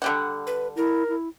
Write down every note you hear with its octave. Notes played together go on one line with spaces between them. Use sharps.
D3 G3 F#5
B4
E4 A#4
E4